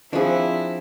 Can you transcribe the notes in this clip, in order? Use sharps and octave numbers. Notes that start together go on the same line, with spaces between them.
F3 C4 D4 E4 G#4 F#5